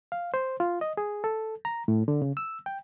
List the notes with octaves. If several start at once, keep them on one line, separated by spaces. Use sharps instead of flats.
F5
C5
F4
D#5
G#4
A4
A#5
A2
D3
C#3
E6
G5